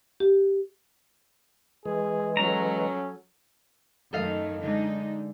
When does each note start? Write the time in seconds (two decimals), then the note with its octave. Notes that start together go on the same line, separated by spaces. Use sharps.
0.20 G4
1.86 E3 G#3 G#4
2.37 F#3 C#4 A4 A#5
4.13 F#2 D#3 A3 A4 D#5 F5
4.63 D3 G#3 D4 D#4